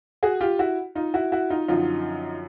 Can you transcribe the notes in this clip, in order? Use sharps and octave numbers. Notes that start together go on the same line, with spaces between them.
F#4 G#4
F4 G4
E4 F#4
D#4 F4
E4 F#4
E4 F#4
D#4 F4
F#2 D3 F3 D#4 F4